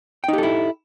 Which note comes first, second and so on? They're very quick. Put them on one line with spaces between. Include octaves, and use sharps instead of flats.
G5 D#4 G4 A4 E4